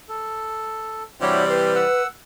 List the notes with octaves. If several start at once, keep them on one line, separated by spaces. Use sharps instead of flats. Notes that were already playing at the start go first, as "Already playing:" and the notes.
A4
C3 E3 G3 D4 E4 F#4 C#5
B4 C5
F#5 E6